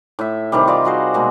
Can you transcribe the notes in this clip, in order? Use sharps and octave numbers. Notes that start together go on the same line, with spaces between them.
A2 E5
C3 D#3 E3 G3
F4 D5 D#5 D6
G3 F#4 G#4 C5
B2 G#3 A#3 C4